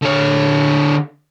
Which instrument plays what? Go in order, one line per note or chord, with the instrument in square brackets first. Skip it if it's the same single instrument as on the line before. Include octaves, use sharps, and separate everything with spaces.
[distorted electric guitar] D3 C#5